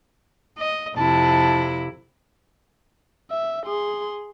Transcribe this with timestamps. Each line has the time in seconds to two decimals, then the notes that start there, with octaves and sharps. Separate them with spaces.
0.58 D#5
0.97 F2 C3 E4 A5
3.31 E5
3.66 G#4 C6